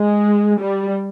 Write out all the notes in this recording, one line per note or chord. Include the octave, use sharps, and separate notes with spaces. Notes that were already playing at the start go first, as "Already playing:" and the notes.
Already playing: G#3
G3